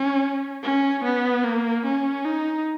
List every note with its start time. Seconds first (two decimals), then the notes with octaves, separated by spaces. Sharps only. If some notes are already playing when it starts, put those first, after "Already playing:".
Already playing: C#4
0.63 C#4
1.04 B3
1.44 A#3
1.86 C#4
2.25 D#4